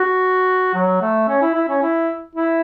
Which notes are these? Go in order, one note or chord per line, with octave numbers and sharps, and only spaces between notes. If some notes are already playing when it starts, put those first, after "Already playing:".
Already playing: F#4
F#3
A3
C#4
E4
E4
C#4
E4
E4